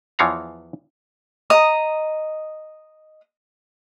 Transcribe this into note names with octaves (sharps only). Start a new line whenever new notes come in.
E2 E3 F3 C#5 F5 A#5
D#5 A#5 D#6